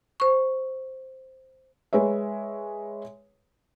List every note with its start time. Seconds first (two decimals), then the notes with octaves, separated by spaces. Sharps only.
0.20 C5 C#6
1.93 G#3 B4 C#5 E5